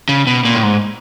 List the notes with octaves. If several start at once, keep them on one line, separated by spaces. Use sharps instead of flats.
C#3
B2
A#2
A2
G#2